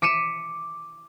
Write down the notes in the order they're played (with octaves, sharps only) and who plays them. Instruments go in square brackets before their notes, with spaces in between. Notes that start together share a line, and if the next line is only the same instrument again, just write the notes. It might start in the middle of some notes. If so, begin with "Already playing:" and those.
[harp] D6 B6 C#7 D#7 E7